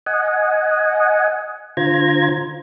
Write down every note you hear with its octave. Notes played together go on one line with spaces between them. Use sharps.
D#5 F#5 G#5
D3 F4 C5 A#5 G#6